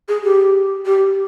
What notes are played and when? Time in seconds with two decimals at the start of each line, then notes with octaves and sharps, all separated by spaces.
0.08 G#4
0.23 G4
0.85 G4